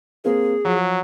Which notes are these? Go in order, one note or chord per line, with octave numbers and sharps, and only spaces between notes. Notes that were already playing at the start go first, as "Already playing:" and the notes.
A#3 C4 G#4 A#4
F3 F#3